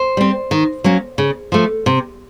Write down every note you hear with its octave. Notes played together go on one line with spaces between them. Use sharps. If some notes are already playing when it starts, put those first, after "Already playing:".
Already playing: C5
G3 C4
D#3
F#3 A#3 C#4
C#3
F3 A3
C3